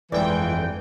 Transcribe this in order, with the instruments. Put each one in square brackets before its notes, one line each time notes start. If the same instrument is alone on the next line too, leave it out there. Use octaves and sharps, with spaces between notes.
[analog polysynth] G1 F2 G5 [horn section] E3 [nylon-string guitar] G#3 D5